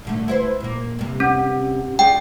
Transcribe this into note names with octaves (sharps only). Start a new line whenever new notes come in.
A#2 D3 A3
E4 B4 C5
A#2 A#3
G2 C3
C#4
D4 F4 G#4 G5